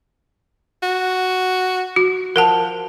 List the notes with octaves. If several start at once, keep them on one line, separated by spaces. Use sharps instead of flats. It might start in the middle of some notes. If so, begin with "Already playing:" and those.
F#4
F#4
F3 A#4 F#5 A5